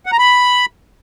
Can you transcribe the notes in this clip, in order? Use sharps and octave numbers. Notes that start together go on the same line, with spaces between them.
F#5
A#5
B5